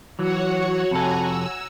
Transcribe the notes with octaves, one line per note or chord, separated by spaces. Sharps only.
E3 F#3 F#4 C#5 F#5
F2 C3 A4 F#5 G#5 A#5
E6